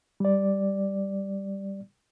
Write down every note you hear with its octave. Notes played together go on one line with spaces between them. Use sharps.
G3 D5